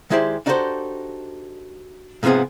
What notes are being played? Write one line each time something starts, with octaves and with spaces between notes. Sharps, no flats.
D#3 G#3 E4 G4 C5 D5
D4 D#4 F#4 G4 A4 C5
G#2 C3 F3 B3 C4 G#4